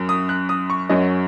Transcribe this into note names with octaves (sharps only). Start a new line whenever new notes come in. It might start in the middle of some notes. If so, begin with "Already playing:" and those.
Already playing: F#2 F#3
D#6
F#6
D#6
C#6
F#2 F#3 C#4 D#5